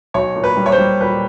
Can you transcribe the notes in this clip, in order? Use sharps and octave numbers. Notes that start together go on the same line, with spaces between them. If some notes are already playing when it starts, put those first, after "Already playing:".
B1 C#5
A#2
B4
G3
C#5
C5
G3
A#2 B4